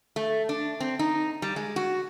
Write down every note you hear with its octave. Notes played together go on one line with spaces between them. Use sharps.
A3
D4
C4
D#4
G3
G#3
F#4